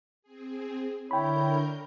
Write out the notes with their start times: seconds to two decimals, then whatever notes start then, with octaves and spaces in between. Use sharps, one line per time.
0.22 C4 G#4
1.11 D3 E4 A#4 C#5 G5 B5 G6